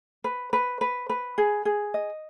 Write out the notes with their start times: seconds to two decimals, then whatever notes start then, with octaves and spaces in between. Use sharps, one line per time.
0.24 B4
0.53 B4
0.81 B4
1.09 B4
1.38 G#4
1.65 G#4
1.94 D#5